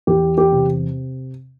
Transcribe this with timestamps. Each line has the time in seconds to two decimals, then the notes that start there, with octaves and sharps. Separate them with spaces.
0.07 E2 G4
0.38 G4
0.52 C3